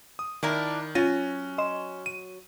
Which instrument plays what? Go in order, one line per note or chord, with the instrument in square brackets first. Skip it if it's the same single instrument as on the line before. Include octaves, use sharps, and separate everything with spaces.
[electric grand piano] D#6
[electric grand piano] D#3 [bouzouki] D4 E4 A#4
[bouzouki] F#3 [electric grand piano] C#4 A#6 D#7 [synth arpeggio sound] F4 A6
[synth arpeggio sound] D#5 C6 E7
[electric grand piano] D#7